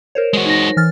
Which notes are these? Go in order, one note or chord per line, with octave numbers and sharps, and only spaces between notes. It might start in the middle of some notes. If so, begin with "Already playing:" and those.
A#4 C5 C#5
G#3 F#4
D#4 A#6
E3 F6 A6